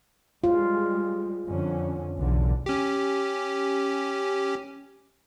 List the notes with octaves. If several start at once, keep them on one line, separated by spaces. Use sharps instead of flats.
G3 G#3 F4
F2 D3 C#4
B1 E2 D3
C#4 G4